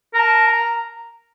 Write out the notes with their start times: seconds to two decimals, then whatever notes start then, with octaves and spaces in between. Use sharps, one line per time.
0.14 A#4 A#5
0.19 A5
0.47 A#5